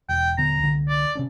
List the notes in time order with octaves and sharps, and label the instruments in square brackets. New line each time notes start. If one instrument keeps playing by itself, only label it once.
[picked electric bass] E1 [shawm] G5
[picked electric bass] D#1 D3 B3 [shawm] A#5
[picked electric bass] C2 D3
[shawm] D5
[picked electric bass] C3 C#4 D4